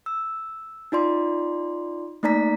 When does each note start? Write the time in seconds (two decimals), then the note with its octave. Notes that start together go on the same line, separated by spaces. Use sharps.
0.06 E6
0.92 D#4 F4 D5 C6
2.23 A3 A#3 D#4 D5 A#5 B6